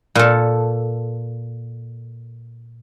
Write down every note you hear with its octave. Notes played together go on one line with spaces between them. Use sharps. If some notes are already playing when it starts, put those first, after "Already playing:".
A#2 A4